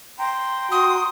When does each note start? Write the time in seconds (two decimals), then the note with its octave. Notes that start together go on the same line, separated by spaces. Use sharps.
0.19 G5 A#5 C6
0.72 F#4 D#6